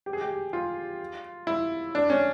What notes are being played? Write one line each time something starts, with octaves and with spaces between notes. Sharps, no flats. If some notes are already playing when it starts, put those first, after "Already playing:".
G4
G#4
G4
F4
E4
D4
C#4